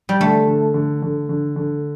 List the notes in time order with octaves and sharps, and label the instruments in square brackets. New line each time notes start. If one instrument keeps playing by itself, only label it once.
[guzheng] G3
[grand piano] D3 [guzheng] A3
[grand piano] D3
D3
D3
D3
D3